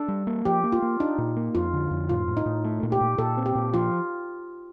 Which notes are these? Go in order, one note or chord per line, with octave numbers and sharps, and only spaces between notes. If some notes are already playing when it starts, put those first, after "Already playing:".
Already playing: D4 A4
G3
A#3
F3 G4
A#3
F4
A#3
D4 D#4
A#2
A#3
F2 F4
D3
F2
A2 F4
A2
D#4
A2
A3
A#2
G4
A#2
A#2 A4
C4
G4
A#2
F3 F4